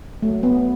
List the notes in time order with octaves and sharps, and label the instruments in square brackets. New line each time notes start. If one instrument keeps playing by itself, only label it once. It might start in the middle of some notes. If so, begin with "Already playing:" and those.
[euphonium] F#3 [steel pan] A3
[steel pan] B3